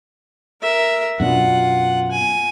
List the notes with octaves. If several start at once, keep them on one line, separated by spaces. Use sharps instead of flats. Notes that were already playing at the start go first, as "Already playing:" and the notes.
A#4 E5
F#2 B2 D4 F4 F#5
G#5